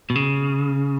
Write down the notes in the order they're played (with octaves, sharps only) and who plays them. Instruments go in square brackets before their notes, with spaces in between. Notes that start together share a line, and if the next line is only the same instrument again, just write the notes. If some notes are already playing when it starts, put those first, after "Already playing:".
[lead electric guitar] B2
C#3